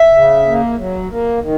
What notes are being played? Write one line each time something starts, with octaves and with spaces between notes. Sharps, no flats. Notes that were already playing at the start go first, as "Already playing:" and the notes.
Already playing: E5
C#3
A#3
F#3
A#3
D#3